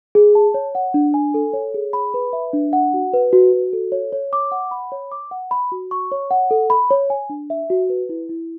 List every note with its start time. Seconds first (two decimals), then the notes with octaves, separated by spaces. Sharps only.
0.15 G#4
0.35 A5
0.54 C#5
0.75 F#5
0.94 D4
1.14 G#5
1.34 A4
1.53 C#5
1.74 G#4
1.93 B5
2.14 B4
2.33 E5
2.53 D4
2.73 F#5
2.94 F#4
3.13 B4
3.33 F#4
3.53 F#4
3.73 A4
3.92 C#5
4.13 C#5
4.33 D6
4.52 F#5
4.71 B5
4.92 C#5
5.12 D6
5.31 F#5
5.51 B5
5.72 F#4
5.91 C#6
6.12 C#5
6.31 F#5
6.51 A4
6.70 B5
6.91 C#5
7.10 G#5
7.30 D4
7.50 E5
7.70 F#4
7.90 B4
8.09 E4
8.29 E4